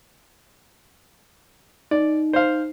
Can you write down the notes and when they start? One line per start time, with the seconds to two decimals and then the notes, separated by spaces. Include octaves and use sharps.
1.91 D#4 D5
2.33 C5 F5